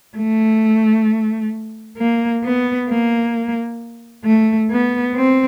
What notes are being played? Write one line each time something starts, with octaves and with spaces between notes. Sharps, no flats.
A3
A#3
B3
A#3
A3
B3
C4